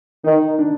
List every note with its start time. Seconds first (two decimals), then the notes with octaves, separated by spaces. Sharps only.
0.24 D#3 D#4
0.59 D4